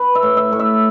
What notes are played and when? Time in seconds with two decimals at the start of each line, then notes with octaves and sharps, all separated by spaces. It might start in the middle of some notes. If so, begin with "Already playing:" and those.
Already playing: B4
0.15 E5
0.23 A2
0.37 E5
0.52 A2
0.59 E5